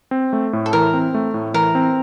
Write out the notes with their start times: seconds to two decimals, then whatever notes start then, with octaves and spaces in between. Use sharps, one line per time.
0.11 C4
0.33 A3
0.53 A2
0.66 A4
0.73 E3 A#4
0.93 C4
1.14 A3
1.34 A2
1.54 E3 A#4
1.75 C4